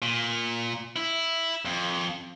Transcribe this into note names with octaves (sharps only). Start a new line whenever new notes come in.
A#2
E4
F2